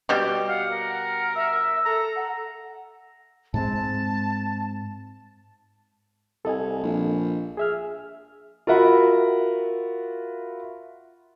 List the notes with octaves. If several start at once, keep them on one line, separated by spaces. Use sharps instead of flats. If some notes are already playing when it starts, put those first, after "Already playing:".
B2 G3 G4
F5 F#5
A#4
E5 E6
A4 A#5
F#5
G#2 G#3 C4 A5
C2 A4 D#5 G#5
A#1
G#4 E5 F6
F4 F#4 A#4 E5 F#5 B5